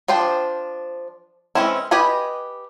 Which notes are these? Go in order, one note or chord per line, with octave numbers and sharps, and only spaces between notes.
F3 D4 C5 G5
E3 G#3 C4 C#4 E4
G4 B4 D#5 G#5 B5